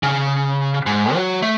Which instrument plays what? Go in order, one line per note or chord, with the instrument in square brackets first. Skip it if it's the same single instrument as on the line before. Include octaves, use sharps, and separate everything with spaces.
[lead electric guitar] C#3
G#2
F#3
A3